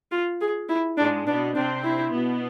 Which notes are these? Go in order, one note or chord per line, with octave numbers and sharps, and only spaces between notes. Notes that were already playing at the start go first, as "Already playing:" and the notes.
F4
G#4
E4
G#2 G#3 D4
B2 B3 D4
C3 C4 D4
E4
B2 B3